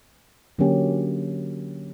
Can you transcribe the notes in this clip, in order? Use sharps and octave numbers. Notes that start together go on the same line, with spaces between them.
D3 F#3 A#3 C#4 G4